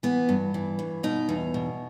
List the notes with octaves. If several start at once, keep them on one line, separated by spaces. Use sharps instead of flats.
E3 B3
G2
E3
G2
B2 D#4
E2
B2